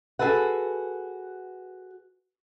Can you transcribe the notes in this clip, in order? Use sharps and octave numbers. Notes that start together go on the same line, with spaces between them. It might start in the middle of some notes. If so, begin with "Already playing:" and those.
F#4 G#4 A4 B4 F#5